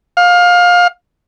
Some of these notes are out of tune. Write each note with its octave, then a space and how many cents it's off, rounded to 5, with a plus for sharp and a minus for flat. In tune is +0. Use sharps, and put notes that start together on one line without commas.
F5 +25